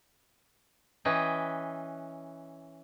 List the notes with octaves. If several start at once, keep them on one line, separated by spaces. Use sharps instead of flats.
E3 C#4 B4 D#5 G5